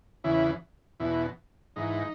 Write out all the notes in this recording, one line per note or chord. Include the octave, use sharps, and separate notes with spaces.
E2 C#3 E3 E4
E2 B2 E4
G#2 E3 D#4